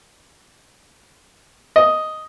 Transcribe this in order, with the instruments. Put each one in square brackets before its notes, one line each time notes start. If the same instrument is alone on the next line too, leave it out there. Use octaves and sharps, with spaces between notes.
[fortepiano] D#5